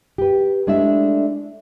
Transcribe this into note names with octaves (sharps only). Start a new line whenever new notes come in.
G4 B4
G#3 A3 D4 E4 D5 E5